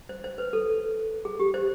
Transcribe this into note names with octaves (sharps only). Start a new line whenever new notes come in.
C5
C5
B4
A4
G#4
G4
C5